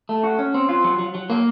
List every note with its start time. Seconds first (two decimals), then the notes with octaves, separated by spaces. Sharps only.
0.09 A3
0.24 F#4
0.39 C#4
0.54 C4
0.69 F4
0.84 F#3
0.99 F#3
1.15 F#3
1.30 A#3